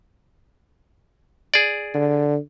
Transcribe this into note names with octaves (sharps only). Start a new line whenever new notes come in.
G#4 D5
D3